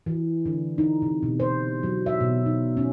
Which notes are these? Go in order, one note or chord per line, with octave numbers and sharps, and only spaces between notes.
E3
D3
D#4
C3
B2
C5
F#3
E5
B2
D#4
C#4